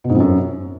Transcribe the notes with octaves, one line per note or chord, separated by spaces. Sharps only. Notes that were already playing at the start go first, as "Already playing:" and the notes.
B2
G#2
F2
F#2